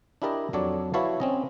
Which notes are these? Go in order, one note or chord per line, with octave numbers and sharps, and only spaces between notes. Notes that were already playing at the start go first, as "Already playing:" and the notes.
D4 E4 G4 A#4 D5 D#5
F2 F#3 D4 A4 C#5 D5
E4 F#4 B4 C#5 F5 A5
C4 C#4 D#5